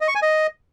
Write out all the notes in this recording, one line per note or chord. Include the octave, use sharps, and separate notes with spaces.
D#5
C#6
G#5
D#5